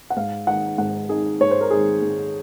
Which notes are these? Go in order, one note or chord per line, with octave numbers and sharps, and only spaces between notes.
F#5
G#2 F5
D#3 G#3 D#4 F#5
G#2 F#5
D#3 G#3 D#4 G#4
G#2 C#5
C5
A#4
D#3 G#3 D#4 G#4
G#2